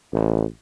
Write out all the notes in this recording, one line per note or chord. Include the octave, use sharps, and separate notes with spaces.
A1